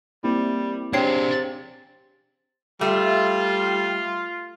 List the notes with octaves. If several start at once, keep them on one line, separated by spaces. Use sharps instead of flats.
G3 A#3 C4 E4
C3 D4 G#4 C#5 G5 C7
G3 A3 F4